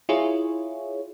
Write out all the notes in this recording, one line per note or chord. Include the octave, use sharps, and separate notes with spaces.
E4 F4 G#4 C#5